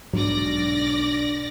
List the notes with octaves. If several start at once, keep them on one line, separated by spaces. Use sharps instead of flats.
B1 G#2 F#3 D4 D5 A#6